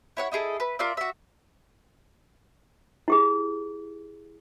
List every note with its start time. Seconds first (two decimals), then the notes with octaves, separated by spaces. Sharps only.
0.17 E4 C#5 F#5
0.32 D#4 E4 G#4 A4
0.60 B4
0.79 F4 A#4 D5 E5
0.97 F#4 E5
3.08 E4 G4 G#4